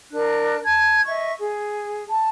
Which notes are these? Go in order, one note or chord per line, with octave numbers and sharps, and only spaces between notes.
D4 A#4 F#6
A5 G#6
D#5 E5 C#6
G#4
A5